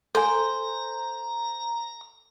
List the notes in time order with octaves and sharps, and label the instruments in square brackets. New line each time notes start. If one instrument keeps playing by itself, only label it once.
[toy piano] A4 G#5 [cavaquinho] C5 [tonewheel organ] A#5